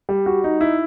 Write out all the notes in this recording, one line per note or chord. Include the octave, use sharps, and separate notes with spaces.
G3
F#4
D#4
E4